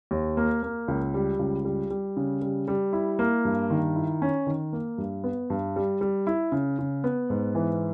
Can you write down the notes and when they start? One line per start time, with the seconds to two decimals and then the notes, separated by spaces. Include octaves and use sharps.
0.11 D#2
0.37 A#3
0.63 A#3
0.88 C#2
1.14 G3
1.39 C#2
1.65 G3
1.90 G3
2.17 C#3
2.42 G3
2.68 G3
2.93 E4
3.19 A#3
3.45 G2
3.70 D#3
3.96 E4
4.22 C#4
4.47 D#3
4.73 A#3
4.98 G2
5.24 B3
5.50 G2
5.76 G3
6.01 G3
6.27 E4
6.52 C#3
6.79 C#3
7.04 B3
7.30 G#2
7.55 E3